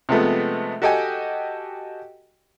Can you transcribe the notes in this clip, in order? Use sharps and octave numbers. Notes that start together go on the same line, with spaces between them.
C3 F3 G#3 A3 B3
F#4 G4 A4 D#5 G5 G#5